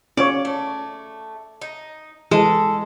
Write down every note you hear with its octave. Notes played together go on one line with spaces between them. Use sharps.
C#4 F4 C#5 D5
A3
D#4
E3 G#3 A4